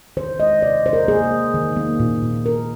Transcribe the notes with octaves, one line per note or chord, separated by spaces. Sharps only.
D#3 C5
G#3 D#5
C3 D5
C3 C5
A#4
A#3 G#4
A#3
D#3
A#3
A#2
A#2
A#3 A#4